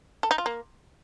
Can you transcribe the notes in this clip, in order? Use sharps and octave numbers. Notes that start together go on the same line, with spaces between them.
A4
D#4
F4
A#3